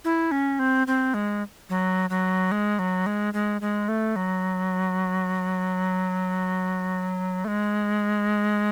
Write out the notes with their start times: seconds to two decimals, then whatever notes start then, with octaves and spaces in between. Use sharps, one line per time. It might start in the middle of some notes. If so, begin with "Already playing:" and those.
0.05 E4
0.32 C#4
0.59 C4
0.87 C4
1.14 G#3
1.69 F#3
2.10 F#3
2.52 G#3
2.79 F#3
3.06 G#3
3.34 G#3
3.61 G#3
3.88 A3
4.16 F#3
7.45 A3
7.48 G#3